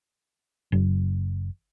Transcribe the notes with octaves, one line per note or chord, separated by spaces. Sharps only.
F#1